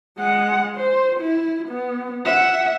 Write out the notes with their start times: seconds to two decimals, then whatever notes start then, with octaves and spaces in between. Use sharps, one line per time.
0.18 G#3 F#5
0.76 C5
1.20 E4
1.68 B3
2.26 E5 F#5